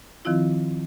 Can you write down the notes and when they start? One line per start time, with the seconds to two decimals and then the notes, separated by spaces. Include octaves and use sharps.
0.25 D#3 F3 C4 E4 F4